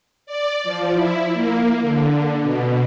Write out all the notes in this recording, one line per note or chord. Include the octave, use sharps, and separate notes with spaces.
D5
F3
E4
A#3
D3
B2